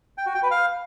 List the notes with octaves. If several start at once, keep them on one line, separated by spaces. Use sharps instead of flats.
G5
F#4
G5
B4
F5